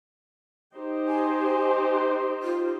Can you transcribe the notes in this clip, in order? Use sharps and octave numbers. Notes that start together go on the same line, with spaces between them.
D#4 G4 C5
G#5
F4